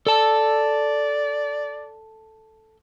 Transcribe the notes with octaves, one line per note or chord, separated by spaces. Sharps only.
A4 D5 A5